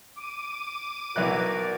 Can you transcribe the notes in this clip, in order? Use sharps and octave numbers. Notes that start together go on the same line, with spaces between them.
D6 D#7
B1 E4 F#4 A#4 D5 F#6